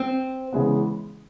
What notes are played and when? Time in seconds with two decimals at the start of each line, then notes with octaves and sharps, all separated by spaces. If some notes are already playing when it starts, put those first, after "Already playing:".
Already playing: C4
0.53 C#3 E3 G#3 B3